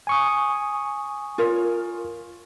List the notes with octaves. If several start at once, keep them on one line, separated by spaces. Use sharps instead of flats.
G#5 C#6 D#6
F4 A#4 C#5